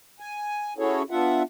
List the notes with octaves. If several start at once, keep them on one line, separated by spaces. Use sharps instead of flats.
G#5
C#4 E4 F#4 G#4 A4 C#5
B3 D4 F4 E5 F#5